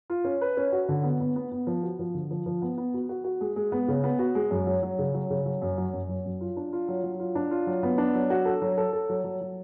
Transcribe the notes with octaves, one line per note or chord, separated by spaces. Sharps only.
F4
C#4
B4
C#4
F#4
D3
B3
B3
B3
B3
F3
F#4
F3
D3
F3
F3
B3
B3
F#4
F#4
F#4
G#3
G#3
B3
C#3
B3
F#4
G#3
F#2
F#3
F#3
C#3
F#3
C#3
F#3
F#2
F#3
F#2
F#3
F#2
F4
D4
F4
F#3
F#3
F4
D4
F4
F#3
B3
D4
F#3
F#4
A4
F#3
A4
A4
F#3
F#3
F#3